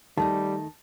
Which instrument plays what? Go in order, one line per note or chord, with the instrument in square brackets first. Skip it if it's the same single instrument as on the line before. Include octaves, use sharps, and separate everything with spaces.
[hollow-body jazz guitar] D#3 A3 D#4 [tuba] G3 [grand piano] A5